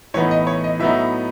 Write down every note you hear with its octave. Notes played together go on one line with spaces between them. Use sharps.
A2 E3 B3 D#4 C#5
D#5
C#5
D#5
A2 F#3 B3 D#4 E5